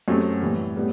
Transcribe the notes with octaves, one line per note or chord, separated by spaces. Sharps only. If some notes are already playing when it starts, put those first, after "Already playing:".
F#2 F#3 A3 C4 G4
A2 E3 G3
A2 G3 B3